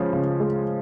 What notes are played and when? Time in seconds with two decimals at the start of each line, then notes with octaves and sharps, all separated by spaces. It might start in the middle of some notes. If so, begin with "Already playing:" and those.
Already playing: C#3 F3 G#3 C#4
0.13 C#3
0.40 G#3